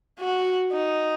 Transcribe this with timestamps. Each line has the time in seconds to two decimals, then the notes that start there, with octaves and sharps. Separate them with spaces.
0.19 F#4
0.72 D#4